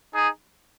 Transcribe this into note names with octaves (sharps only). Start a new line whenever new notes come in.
D#4 G#4